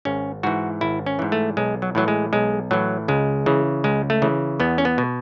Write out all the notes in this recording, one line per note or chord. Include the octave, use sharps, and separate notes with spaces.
G#1 C#4
G#2 E3 F#4
G#1 E4
C#4
G#2 E3
A3
B1 G#3
F#3
A2 E3 F#3
G#3
B1 G#3
A2 E3 F#3
C#2 G#3
C#3 E3
C#2 G#3
A3
C#3 E3
E2 B3
C#4
B3
B2